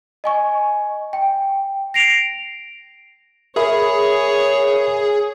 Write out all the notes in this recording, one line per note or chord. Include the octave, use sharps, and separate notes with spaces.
D#5 G#5 C#6
G5
A#6 C7 D7 F7
G#4 A#4 C#5 E5 B5